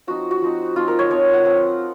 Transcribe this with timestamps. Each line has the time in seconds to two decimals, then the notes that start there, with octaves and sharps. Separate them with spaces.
0.07 F3 C4 D#4 F#4
0.31 F#4
0.42 F3 C4 D#4
0.76 F3 C4 D#4 F4
0.88 A#4
0.99 C#5
1.10 F3 C4 D#4 C#5
1.34 F#5
1.45 F3 C4 F4